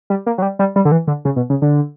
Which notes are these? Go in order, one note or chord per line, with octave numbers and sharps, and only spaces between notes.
G3
A#3
F#3
G3
G3
G3
D3
E3
D3
C#3
B2
C#3
D3